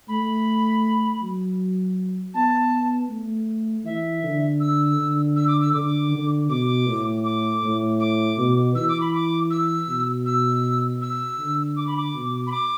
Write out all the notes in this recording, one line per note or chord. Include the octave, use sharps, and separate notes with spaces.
A3 B5
F#3
B3 A5
A3
E3 E5
D3
E6
D3
E6
D6
E6
D3 D6
D3
B2 D6
A2
D6
A2
D6
B2
E3 E6
D6
B5
D6
E6
B2
E6
E6
D3
D6
B5
D6
B2
B5
D6